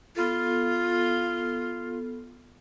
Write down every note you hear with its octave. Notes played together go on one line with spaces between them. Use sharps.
B3 F4 A4